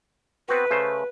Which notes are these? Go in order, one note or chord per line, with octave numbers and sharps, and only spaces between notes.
B3 C4 F#4 B4
C#3 A3 C5